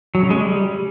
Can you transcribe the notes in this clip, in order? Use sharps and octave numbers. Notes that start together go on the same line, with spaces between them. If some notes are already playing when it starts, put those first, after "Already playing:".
F#3
C#3
G#3
G3